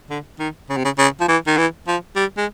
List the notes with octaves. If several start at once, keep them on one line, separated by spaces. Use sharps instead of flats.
D3
D#3
C#3
C3
C#3
C#3
F3
E3
D#3
E3
F3
G3
G#3